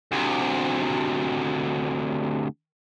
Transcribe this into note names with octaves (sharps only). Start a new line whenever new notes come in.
D2 C3